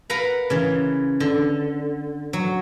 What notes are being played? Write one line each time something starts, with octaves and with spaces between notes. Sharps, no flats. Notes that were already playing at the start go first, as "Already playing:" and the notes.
A#4 B4 F5 F#5 A#5 B5
C#3 E3
D3
F#3